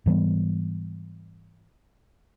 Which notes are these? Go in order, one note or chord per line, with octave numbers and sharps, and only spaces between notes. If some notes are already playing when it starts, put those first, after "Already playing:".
G#2 E3 G3 B3